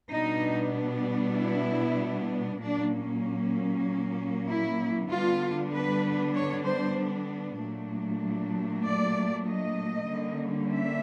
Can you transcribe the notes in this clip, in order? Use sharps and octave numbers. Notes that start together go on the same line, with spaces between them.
B2 G3 B3 D4 D#4
E4
A#2 F#3 A#3 C#4 D4
E4
D3 G3 B3 D4 F4
B4
C#5
C5
A#2 F#3 A3 D4
D5
D#5
D3 G3 A#3 C#4
E5